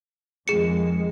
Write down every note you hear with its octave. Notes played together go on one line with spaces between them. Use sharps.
F2 D#3 G#3 G#4 C#7